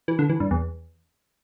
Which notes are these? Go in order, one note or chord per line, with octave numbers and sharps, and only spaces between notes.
E3
D3
E3
G2
E2